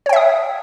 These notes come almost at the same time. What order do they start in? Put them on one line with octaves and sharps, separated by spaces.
C#5 G5 E5 D#6